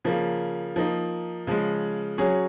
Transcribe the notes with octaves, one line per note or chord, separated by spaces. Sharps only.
C#3 F3 A#3
F3 A#3 D#4
C#3 F3 G#3
F#3 C#4 G#4